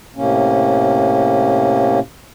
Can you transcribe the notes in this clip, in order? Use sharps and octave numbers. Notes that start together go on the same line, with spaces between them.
A2 C3 A#3 C#4